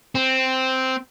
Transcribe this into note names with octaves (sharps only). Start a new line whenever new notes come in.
C4